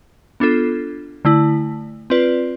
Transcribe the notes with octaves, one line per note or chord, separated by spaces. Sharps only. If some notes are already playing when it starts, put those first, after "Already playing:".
B3 D4 F4 A4
D3 A3 E4
C4 F4 B4 D5